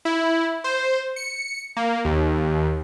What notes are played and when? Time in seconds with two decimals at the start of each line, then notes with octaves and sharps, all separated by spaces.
0.05 E4
0.64 C5
1.16 C#7
1.77 A#3
2.05 D#2